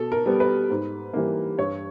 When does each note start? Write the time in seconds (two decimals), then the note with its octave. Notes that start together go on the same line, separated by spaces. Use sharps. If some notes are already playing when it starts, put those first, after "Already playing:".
Already playing: B2 A4
0.12 A#4
0.26 G3 B3
0.40 B4
0.70 G#2
1.13 E3 G3 A#3
1.58 G2 C#5